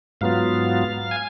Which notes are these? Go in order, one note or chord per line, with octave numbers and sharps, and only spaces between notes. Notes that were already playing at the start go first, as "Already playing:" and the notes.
G#2 F#3 B3 F4 F5
G#5